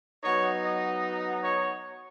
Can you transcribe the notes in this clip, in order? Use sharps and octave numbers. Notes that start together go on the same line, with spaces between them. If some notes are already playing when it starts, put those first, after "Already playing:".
F#3 B3 D#4 C#5
D#5
C#5